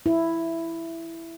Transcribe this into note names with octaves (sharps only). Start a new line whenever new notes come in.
E4